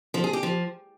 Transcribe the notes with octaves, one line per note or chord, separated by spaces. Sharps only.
F3
G#4
G4
F3